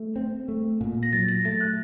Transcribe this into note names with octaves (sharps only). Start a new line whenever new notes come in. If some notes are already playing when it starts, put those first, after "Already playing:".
Already playing: A3
C4
A3
A#2
A#6
F#3 A6
A#6
A3 A6
F#6